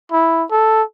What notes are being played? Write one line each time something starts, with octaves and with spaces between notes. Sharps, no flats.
E4
A4